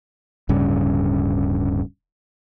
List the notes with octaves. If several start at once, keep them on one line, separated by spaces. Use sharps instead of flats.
D1 G2 C#3